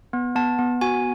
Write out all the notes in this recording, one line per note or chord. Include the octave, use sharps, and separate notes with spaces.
B3
B3 A5
B3
F#4 G#5